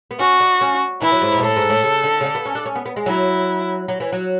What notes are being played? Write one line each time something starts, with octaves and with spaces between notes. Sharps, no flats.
B3
C#4 F#4
D4
C#4
E3 E4
F#3
G#2
G#2
B2
A2 A4
G#2
A2
C#3
D3
C#3
D3
B3
C#4
D4
C#4
B3
B3
G#3
F#3 E4
F#3
E3
F#3